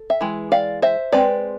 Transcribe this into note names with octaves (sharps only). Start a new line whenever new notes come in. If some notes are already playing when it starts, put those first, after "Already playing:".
Already playing: A4
E5
E3 G#3
D5 F5
C5 E5
G#3 C4 B4 D5